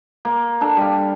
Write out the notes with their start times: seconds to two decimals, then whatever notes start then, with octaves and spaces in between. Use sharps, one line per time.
0.25 A#3
0.61 D4 A4
0.77 G3 F5